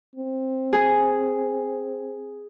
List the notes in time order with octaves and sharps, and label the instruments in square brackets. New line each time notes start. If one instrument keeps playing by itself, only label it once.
[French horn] C4
[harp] G#4